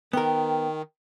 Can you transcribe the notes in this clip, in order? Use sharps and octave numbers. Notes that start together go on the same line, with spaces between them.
D#3 B3 A#4 G5